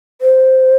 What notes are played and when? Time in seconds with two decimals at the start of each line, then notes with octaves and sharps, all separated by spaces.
0.22 C5